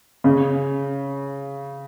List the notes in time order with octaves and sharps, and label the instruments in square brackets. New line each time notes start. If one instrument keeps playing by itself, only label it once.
[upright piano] C#3